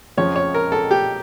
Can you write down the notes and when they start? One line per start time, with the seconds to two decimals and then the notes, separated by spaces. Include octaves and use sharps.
0.17 F2 C#3 F3 C#5
0.36 C#5
0.54 A#4
0.72 A4
0.91 G4